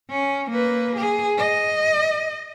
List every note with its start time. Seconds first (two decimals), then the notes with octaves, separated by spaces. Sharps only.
0.10 C#4
0.50 A#3 B4
0.96 G#4
1.38 D#5